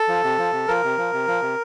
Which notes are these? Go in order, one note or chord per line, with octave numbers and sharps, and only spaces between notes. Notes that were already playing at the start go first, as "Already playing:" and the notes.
Already playing: A4
F3
C3
F3
C3
F3 A#4
C3
F3
C3
F3
C3